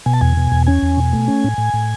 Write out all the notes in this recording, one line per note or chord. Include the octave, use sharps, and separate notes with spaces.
B2 G#5
A5
E2 G#5
B2
E2
C#4 G#5
E2
B2
A3
C#4
A2
A2
A2